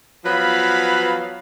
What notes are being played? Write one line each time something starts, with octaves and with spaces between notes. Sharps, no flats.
F3 F#3 B3 B4 F5 B5